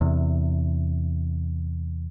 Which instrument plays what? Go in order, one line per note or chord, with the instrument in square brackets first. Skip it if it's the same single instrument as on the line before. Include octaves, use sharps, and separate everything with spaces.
[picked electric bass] E2 C3